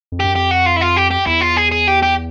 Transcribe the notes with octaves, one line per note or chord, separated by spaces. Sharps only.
F2
F#2 G4
F2 G4
F#4
F4
E4
F4
G4
G4
E2 E4
F4
G#4
G#4
G4
G4